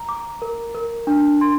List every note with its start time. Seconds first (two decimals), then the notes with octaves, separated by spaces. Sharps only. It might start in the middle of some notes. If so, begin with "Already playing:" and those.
Already playing: A#5
0.09 D6
0.42 A#4
0.75 A#4
1.07 D4
1.41 C6